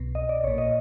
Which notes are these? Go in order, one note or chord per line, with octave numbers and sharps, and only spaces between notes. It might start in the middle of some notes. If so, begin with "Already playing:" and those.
Already playing: C2 B2
D#5
D5
A#1 A#2 C#5
D#5